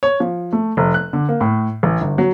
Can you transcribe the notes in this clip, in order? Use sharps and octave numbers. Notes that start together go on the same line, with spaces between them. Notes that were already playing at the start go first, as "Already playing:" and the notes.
C#5
F3
A3
F1
F#6
D3
A#3
A2
A1
G1
F#3